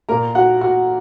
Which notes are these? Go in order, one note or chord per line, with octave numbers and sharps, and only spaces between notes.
A#2 A#3 A#4 A#5
F#4 F#5
F#4 F#5